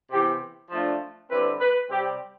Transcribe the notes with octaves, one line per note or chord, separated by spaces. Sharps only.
C3 E3 B3 G4
F3 A3 D4 F4
D3 G3 C4 E4 B4
B4
C3 G3 C4 G4